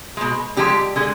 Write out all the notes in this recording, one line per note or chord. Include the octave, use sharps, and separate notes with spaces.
B2 G#3
D3 F3 G#3 G4
D3 G#3